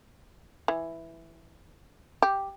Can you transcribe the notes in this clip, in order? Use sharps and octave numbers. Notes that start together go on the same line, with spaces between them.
E3
G4